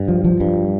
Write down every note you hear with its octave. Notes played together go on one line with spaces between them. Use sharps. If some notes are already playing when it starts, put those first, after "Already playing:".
Already playing: G2
F3
F3
G2